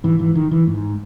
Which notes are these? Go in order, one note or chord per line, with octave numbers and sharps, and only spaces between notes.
G#2 E3
E3
D#3
E3
G#2